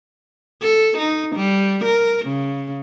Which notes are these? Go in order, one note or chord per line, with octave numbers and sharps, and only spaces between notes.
A4
D#4
G3
A#4
C#3